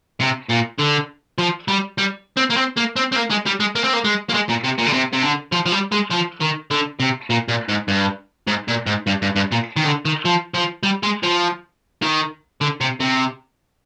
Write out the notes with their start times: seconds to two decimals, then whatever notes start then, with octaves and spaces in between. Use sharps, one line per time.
0.21 C3
0.50 A#2
0.79 D3
1.38 F3
1.68 G3
1.98 G3
2.37 C4
2.50 A#3
2.57 C4
2.77 A#3
2.96 C4
3.12 C4
3.16 A#3
3.30 G#3
3.46 G3
3.60 G#3
3.76 A#3
3.84 C4
3.93 A#3
4.04 G#3
4.29 A#3
4.34 G#3
4.49 A#2
4.64 C3
4.78 A#2
4.86 D3
4.93 C3
5.13 C3
5.23 D3
5.52 F3
5.66 F3
5.72 G3
5.92 G#3
6.11 F3
6.41 D#3
6.71 D3
7.00 C3
7.30 A#2
7.49 A#2
7.69 G#2
7.88 G2
8.47 G#2
8.68 A#2
8.86 G#2
9.07 G2
9.22 G2
9.36 G2
9.52 A#2
9.76 D#3
9.85 D3
10.05 D#3
10.25 F3
10.54 F3
10.83 G3
11.03 G#3
11.23 F3
12.02 D#3
12.61 D3
12.81 C3
13.00 C3